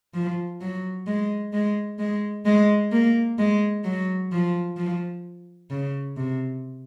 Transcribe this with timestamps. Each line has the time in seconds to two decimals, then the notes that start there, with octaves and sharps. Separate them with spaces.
0.14 F3
0.61 F#3
1.07 G#3
1.53 G#3
1.99 G#3
2.45 G#3
2.91 A#3
3.38 G#3
3.84 F#3
4.32 F3
4.77 F3
5.70 C#3
6.17 C3